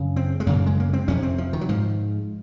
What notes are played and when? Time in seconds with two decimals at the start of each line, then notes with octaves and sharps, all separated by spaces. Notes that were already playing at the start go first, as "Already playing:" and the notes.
Already playing: F#2 C#3
0.16 C4
0.40 G#3
0.47 F#2 C#3 A#3
0.66 G#3
0.80 A#3
0.93 C4
1.08 F2 C3 C#4
1.23 C4
1.38 F3
1.53 D#3
1.61 F#3
1.69 G#2 F3